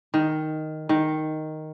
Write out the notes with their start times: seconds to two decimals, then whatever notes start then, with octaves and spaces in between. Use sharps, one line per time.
0.14 D#3
0.89 D#3